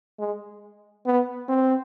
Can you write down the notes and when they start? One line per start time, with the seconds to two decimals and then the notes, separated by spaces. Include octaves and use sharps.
0.19 G#3
1.06 B3
1.49 C4